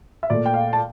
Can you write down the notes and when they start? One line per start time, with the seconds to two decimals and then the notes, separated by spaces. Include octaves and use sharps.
0.23 E5
0.30 A#2 A3 D5
0.46 G5
0.54 F5
0.73 A5